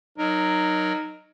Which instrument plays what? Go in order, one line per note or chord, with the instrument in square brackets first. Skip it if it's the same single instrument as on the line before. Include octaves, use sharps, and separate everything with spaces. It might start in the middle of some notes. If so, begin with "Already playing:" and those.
[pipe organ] F#3 A#4 [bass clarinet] D#4